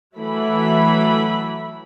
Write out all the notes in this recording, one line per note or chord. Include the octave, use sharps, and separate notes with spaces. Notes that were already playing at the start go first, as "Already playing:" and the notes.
E3 F#3 A3 E4 B5